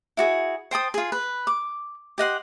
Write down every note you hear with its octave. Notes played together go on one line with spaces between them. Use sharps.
E4 F#4 G#4
C5 G5 A5 D#6
F4 G#4
B4
D6
G4 D#5 F#5 C6